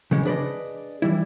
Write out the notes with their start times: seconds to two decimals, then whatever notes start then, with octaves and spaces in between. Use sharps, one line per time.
0.11 C#3 E3 G#3 C#4
0.25 D4 G#4 B4 C5 D5 D#5
1.02 E3 G3 E4